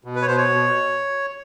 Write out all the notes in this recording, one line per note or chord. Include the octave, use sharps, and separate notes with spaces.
B2
B4
C#5
B2 C5
C#5
B2